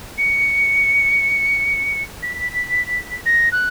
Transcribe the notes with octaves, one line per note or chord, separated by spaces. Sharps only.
C#7
B6
A#6
F#6